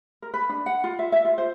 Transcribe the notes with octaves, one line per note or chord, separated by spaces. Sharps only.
A#4
B4
D4
F#5
F4
E5
E5
F4
C5